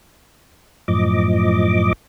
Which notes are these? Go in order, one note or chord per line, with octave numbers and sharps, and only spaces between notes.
F#2 A2 F3 D#5 D6